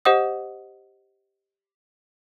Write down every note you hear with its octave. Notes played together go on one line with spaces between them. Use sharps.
G4 C5 D#5 F#5 D#6